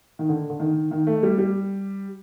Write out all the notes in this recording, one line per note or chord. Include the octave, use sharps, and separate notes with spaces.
D#3
D3
D3
D#3
D#3
A3
G3
G3